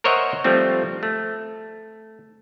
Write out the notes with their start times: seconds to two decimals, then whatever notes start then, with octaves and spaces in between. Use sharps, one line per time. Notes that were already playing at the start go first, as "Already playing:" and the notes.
0.04 A#4 C5 C#5 D#5 E5 F#5
0.44 F3 G3 A3 C4
1.03 A3